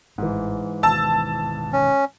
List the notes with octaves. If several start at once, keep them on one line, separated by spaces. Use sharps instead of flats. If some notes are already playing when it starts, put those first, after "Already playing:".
A1 G#2 E3
G#1 B2 D#3 A5 E6
C#4